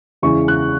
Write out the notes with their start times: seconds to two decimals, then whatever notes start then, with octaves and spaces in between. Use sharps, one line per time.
0.22 E2 C#3 E3 G#3 C#6
0.48 F#6